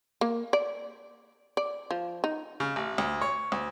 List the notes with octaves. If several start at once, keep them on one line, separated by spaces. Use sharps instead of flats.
A#3
D5
D5
F3
D#4
C#3
A1
D2
C#5
D2